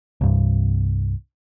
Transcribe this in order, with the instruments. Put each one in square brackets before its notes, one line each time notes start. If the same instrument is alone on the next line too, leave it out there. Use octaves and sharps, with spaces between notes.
[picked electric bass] C2 G2